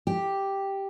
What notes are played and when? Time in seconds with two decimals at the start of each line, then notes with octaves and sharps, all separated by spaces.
0.07 G4